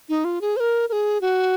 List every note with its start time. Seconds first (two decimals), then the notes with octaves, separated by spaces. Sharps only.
0.09 D#4
0.24 F4
0.41 G#4
0.57 C5
0.60 A#4
0.89 A#4
0.92 G#4
1.21 F#4